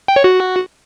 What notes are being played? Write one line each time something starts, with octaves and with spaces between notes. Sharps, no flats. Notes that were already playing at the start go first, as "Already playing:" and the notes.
G5
C#5
F#4